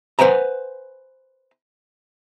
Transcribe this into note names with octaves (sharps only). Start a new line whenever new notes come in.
B4 C5 F#5 G#5 A#5